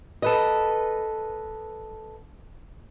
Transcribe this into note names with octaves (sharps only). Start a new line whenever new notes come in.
A4 B4 D#5